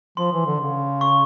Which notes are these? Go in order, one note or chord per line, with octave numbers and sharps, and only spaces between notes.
F3 C6
E3
D3
C#3
C#6